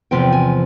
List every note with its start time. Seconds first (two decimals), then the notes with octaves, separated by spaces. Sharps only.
0.11 E2 C3 F3 G5
0.32 G#5